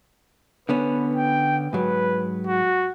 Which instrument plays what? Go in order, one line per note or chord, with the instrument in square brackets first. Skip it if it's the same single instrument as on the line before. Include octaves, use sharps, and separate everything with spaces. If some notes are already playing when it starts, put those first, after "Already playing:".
[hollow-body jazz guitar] D3 B3 C#4 [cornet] B4
[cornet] G5
[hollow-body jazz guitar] G#2 F#3 [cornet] B4
[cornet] F#4